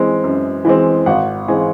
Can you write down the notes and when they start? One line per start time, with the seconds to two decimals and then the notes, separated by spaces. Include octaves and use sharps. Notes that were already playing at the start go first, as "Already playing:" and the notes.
Already playing: E3 G#3 C4
0.24 F#2
0.65 E3 G#3 C4
1.06 G#1 F#5
1.48 E3 G#3 C4 G#5